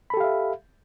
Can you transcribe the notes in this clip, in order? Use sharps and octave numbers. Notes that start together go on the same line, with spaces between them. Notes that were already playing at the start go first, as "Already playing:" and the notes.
G4 A4 E5 F5 B5